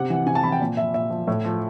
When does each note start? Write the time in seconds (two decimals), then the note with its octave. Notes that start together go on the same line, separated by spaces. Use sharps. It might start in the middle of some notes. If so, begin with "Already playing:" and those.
Already playing: C3 F#5
0.10 E3
0.27 C3 G#5
0.35 A5
0.44 E3 B5
0.52 G5
0.61 A#2
0.77 F3 E5
0.94 A#2 E5
1.10 F3
1.27 A2
1.45 F3